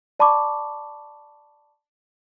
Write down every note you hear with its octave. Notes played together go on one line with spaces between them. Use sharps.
D5 A5 B5 C#6 D6